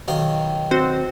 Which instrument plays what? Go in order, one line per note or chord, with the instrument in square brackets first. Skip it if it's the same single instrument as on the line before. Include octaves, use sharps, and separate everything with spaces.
[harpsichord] B1 D#3 F5
[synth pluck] C4 F#4 C5